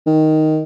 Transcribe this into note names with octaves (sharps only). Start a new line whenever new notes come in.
D#3